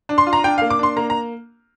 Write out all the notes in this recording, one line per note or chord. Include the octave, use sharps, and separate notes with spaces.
D4
C6
F4
A#5
D4 G5
A#3 F5
D6
D4 C6
A#3 A#5
A#5